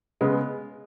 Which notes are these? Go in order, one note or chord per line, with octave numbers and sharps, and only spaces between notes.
C#3 G#3 B3